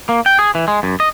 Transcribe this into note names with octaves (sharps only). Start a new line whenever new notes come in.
A#3
G5
G#4
E3
G#3
F#2
D#5